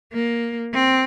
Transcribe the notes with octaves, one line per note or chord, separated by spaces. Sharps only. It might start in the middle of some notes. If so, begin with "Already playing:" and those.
A#3
C4